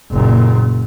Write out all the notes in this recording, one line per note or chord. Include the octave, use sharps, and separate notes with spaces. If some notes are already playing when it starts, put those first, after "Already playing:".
F#1 A#2